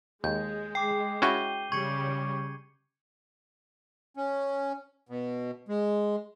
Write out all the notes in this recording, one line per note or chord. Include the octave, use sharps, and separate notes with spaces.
D#2 G#3 G6
G5 D6 C7
C#4 E4 F#4 G6 D#7 G7
C#3 G3 C#6 G#6 C#7
C#4
B2
G#3